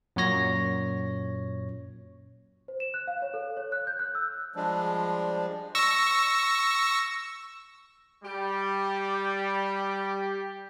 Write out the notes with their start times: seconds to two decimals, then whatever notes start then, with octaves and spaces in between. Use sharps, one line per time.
0.16 F#2 A#2 C#5 A#6
2.68 C5
2.80 E7
2.94 F#6
3.07 F5
3.22 C#5
3.34 A4
3.57 C#5
3.72 F#6
3.87 G6
3.99 F#6
4.15 E6
4.56 F3 G3 G#3 D4
5.75 C#6 E6 A#6
8.24 G3 G4